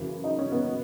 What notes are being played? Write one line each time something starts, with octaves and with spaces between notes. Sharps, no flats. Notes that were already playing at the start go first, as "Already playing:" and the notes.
Already playing: F#2 C#3 E3
D#4
C#4
B3
B2